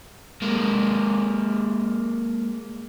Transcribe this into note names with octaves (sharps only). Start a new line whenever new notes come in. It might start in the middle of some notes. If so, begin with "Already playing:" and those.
G#3 A#3